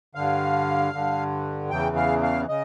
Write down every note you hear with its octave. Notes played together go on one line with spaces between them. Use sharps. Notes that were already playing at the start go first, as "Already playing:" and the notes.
G2 D3 F5
G2 D3
E2 C#3 E3 G5
F5
F5
C#3 D#5